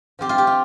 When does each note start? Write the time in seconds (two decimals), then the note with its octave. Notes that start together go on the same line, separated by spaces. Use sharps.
0.19 F3 C4 F4 G4
0.29 F4
0.38 G4
0.47 F4